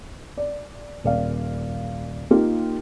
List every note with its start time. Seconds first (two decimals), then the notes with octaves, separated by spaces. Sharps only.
0.38 D5
1.04 D#1 D5 F5
2.31 A#3 D#4 F4 G4 A#4